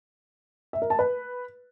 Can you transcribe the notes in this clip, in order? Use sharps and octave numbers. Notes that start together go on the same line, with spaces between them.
E5
A#4
A5
B4